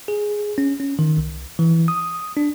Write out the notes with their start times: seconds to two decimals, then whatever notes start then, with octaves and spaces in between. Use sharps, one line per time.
0.08 G#4
0.58 C#4
0.80 C#4
0.99 D#3
1.18 C2
1.59 E3
1.88 D#6
2.37 D4